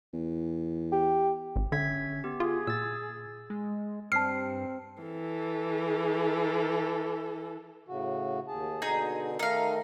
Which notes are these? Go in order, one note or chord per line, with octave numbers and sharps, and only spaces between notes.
E2
G4
G#1
D3 C#4 E5 G#6 B6
B3 G4
F4 G#4
A#2 E6 A6
G#3
G2 C4 A5 F6 C7
E3 A4
A2 C#3 F#4
D#2 G#4 A5
B2 D3 D#4 G#4 A#5
D#3 A3 D#4 A#4 F5